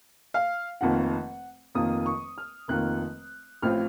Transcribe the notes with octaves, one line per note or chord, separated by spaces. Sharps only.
F5
F1 F2 D#3 A#3 F4 F#5
F1 F2 D#3 A#3 F4 D#6
C#6
F6
F1 F2 D#3 A#3 F4 F#6
A1 A2 F3 C4 F4 F6